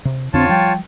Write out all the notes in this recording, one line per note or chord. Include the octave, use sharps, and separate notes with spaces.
C3
F2 D3 C4 D4 F4 C#5 A5
F3 G3 G5